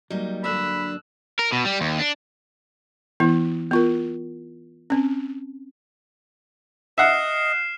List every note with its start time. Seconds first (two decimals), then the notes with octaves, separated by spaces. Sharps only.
0.10 F#3 G3 A#3 D#4
0.44 G2 D3 D4 B5 E6 F#6
1.39 A#4
1.52 B2
1.65 G3
1.81 D#2
1.99 D4
3.20 E3 B3 E4
3.71 B3 F4 A#4
4.90 C4 C#4
6.98 D#5 E5 F#5 F6 C7 E7